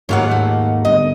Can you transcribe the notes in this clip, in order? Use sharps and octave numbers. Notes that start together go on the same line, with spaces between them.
D#2 G#2 F#3 A#3 F4 C#5 F#5
A3
G1 D#5